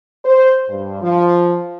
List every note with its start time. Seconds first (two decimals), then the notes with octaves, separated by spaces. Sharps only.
0.24 C5
0.69 G2
1.02 F3